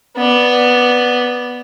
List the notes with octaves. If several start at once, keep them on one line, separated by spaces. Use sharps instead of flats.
B3 D5